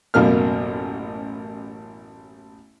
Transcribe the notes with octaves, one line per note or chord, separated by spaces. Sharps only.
A1 F#2 B2 A#3 F6